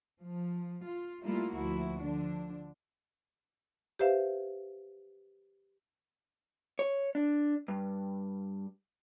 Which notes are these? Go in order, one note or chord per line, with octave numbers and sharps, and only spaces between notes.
F3
F4
G3 A3 A#3 E4 F4
D2 F3 E4 F#4
D3 F3 D4
G4 B4 C5 E5 F5
C#5
D4
G2